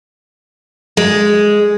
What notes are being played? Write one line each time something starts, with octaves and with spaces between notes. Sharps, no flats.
G#3